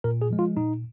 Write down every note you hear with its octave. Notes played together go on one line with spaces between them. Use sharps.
A#2 A#4
G#4
F3 G#3
F4
A#2 D#4